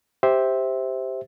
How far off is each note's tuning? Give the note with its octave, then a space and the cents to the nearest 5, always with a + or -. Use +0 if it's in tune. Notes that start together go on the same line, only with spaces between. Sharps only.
G4 +0 C5 +0 E5 -15